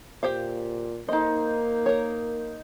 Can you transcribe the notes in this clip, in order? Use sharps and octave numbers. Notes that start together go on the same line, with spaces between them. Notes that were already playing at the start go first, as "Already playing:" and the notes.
A#2 G4 C5 F5
A#3 D#4 A4 C5 D#5
A#4 C#5